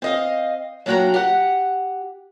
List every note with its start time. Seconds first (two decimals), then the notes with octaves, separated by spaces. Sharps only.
0.02 C4 D#5 F5
0.86 F#3 A#3 D4 F#4 G5 A#5
1.14 G4 F#5